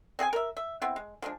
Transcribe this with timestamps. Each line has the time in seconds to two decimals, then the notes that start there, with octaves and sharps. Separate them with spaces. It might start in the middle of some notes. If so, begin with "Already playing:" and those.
0.19 C4 G#4 F#5 G#5
0.33 A#4 E5
0.57 E5
0.82 B3 C4 E4
0.96 G#3
1.22 F3 G#3 A#3 D4